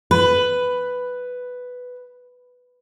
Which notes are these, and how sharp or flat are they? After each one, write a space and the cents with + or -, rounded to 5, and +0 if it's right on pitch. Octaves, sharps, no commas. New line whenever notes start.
B4 +5